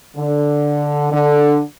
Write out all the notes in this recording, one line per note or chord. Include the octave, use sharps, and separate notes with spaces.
D3
D3